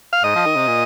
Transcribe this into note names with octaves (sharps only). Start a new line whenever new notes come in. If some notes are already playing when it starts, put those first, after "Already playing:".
F5
G#2 D#5
F3
D#3
C3
A#2